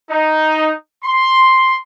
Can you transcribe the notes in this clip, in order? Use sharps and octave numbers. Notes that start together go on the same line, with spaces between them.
D#4
C6